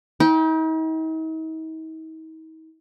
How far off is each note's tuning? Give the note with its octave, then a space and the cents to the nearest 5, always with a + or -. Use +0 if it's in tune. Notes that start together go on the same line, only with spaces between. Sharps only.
D#4 +45 G5 +0